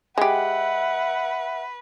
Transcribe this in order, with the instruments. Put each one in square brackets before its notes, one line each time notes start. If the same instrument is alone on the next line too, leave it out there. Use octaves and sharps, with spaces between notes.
[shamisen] G#3 G4 [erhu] B4 [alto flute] E5 [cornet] F#5